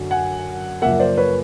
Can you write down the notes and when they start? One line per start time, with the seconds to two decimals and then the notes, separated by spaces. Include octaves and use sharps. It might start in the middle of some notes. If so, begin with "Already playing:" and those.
Already playing: F#2 D3 F#3
0.11 F#5 G#5
0.82 F#2 C#3 F3 A#3 E5 F#5
1.00 C5 D5
1.18 B4 C#5